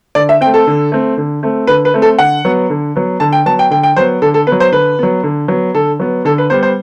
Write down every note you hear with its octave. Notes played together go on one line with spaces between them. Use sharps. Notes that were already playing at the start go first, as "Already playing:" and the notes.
D3 D5
E5
A3 C4 G5
A4
D3
A3 C4
D3
A3 C4
D3 B4
B4
A3 C4
A4
D3 F#5
F#3 B3
D3
F#3 B3
D3 A5
G5
F#3 B3 A5
G5
D3 G5
G5
F#3 B3 C5
D3 A4
A4
B3 B4
F#3
C5
D3 B4
F#3 B3
D3
F#3 B3
D3 A4
F#3 B3
D3 A4
B4
G3 B3 C5
C5